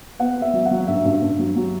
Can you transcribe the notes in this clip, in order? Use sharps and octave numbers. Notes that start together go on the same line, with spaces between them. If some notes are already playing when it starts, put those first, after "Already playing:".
B3 F#5
B3
E5
F#3
F#5
F#3
G2 E5
G2
G2
F#3
F#3